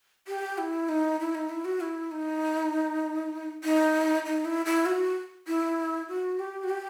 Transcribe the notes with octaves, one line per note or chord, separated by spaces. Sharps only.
G4
E4
D#4
E4
D#4
E4
F#4
E4
D#4
D#4
D#4
E4
E4
F#4
E4
F#4
G4
F#4
G4